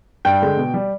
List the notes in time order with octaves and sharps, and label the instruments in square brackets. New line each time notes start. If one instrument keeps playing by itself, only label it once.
[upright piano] G2 G5
D3 G#3
B2
G3